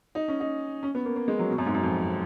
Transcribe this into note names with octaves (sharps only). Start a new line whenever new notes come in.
D#4
C#4
D#4
C#4
B3
A#3
A#3
G#3
F#3
B2
F#2
G#2
F#2
F2